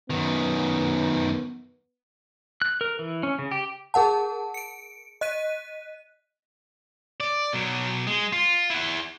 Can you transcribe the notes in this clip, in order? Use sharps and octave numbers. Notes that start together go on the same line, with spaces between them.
F#2 D#3 B3
F#6
A#4
E3
C#4
C#3
G4
G#4 A#4 F#5 A5
C#7 D7
D#5 F#6 B6 D#7
D5
B2 F#3
G#3
F4
E4 F#5